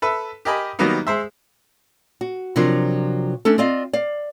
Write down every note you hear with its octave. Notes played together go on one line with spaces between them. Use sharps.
A4 B4 E5
G4 A#4 D#5 G#5 B5
D#3 F#3 G3 A#3 B3 D#4
G#3 C5 E5
F#4
C3 F3 F#3 D4 F4 A#4
A3 C#4 D4 A4
C4 F4 D5 D#5 F5
D5 F5